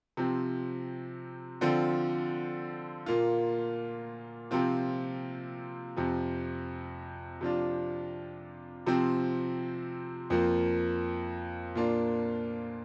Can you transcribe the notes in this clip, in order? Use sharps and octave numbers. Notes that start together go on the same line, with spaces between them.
C3 F3 C4
D3 F3 C4 F4
A#2 A#3 F4
C3 F3 C4 F4
F2 C3 F3
C3 F3 D4 F4
C3 F3 C4
F2 F3 A#3
A#2 A#3 D4 F4